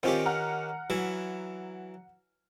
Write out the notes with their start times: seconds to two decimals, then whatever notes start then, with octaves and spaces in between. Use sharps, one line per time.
0.03 D#3 C4 C#4 F4 G4
0.26 F#5 A#5 F6
0.90 E3 F#3 E4